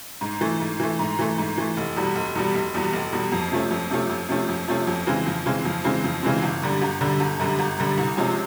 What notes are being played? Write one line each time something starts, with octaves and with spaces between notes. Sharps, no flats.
G#2
E3 A3
G#2
E3 A3
G#2
E3 A3
G#2
E3 A3
F1
E2 B2 G3
F1
E2 B2 G3
F1
E2 B2 G3
F1
E2 B2 G3
F2
C3 F3 A3 C#4
F2
C3 F3 A3 C#4
F2
C3 F3 A3 C#4
F2
C3 F3 A3 C#4
F2
C#3 E3 G#3 C4
F2
C#3 E3 G#3 C4
F2
C#3 E3 G#3 C4
F2
C#3 E3 G#3 C4
G1
F#2 D3 G3
G1
F#2 D3 G3
G1
F#2 D3 G3
G1
F#2 D3 G3
C2
C3 F3 G#3 C#4